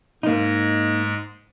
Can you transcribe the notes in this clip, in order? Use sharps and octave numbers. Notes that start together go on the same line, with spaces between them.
G#2 G#3 A#3 D#4